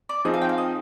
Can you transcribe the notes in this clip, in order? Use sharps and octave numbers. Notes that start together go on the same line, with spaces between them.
D5
F3 C4 D#4 G#4 D#5
F5
G5
F5
D#5